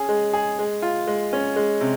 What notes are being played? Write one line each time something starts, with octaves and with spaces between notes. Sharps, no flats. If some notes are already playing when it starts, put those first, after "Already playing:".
Already playing: C#4 G#4
G#3
G#4
G#3
F4
G#3
C#4
G#3
C3